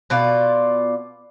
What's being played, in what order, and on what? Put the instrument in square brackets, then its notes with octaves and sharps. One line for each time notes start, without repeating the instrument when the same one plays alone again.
[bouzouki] B2 F4 D5